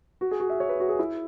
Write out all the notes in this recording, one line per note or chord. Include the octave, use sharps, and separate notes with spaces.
F#4
G#4
F#4
E5
C#5
B4
F#4
G#4
E4